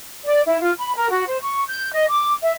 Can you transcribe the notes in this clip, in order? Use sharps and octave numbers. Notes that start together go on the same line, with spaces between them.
D5
E4
F4
B5
A#4
F#4
C5
C#6
G6
D#5
D6
E5